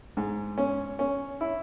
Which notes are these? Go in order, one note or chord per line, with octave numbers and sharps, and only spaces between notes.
G#2
C#4
C#4
E4